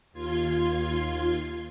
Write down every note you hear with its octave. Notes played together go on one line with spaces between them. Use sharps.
D#2 F4 C6 G#6